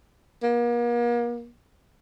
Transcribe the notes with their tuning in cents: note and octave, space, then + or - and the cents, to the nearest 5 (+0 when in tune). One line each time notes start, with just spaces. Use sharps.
A#3 +40